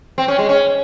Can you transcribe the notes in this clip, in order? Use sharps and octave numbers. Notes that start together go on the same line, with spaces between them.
C4
C#4
G#3
C#4